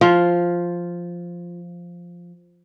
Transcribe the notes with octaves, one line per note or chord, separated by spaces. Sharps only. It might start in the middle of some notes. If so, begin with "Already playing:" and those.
F3 F4